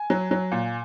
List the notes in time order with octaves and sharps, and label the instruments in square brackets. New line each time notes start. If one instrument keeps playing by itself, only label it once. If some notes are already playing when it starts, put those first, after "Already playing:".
Already playing: [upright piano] G#5
F#3
F#3
A#2